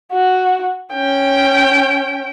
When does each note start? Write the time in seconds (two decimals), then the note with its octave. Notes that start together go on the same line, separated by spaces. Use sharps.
0.12 F#4
0.94 C#4 G5